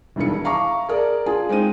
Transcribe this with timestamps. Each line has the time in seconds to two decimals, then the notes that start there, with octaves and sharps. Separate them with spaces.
0.16 E1 G2 D#3 E4 C#7
0.44 E5 F5 A#5 C#6 D6
0.89 G#4 A#4 D5
1.26 F4 G#4 G#5
1.49 G#3 C4 D#4 D#7